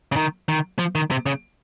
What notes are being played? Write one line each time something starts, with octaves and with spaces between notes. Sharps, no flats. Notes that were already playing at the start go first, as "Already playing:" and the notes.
C#3
D#3
D#3
F3
D#3
C3
C#3